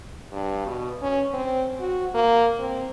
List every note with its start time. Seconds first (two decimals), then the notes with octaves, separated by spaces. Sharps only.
0.32 G2
0.66 B2
1.02 C#4
1.33 C4
1.80 F#4
2.14 A#3
2.59 C4